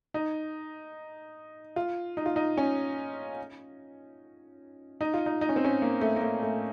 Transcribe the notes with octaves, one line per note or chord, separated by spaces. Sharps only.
D#4
F4
D#4
F4
D#4
C#4
D#4
F4
D#4
D#4
C#4
C4
C#4
A#3
A3
A#3
A3
A3